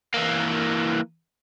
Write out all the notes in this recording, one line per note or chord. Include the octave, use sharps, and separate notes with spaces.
E3 A#3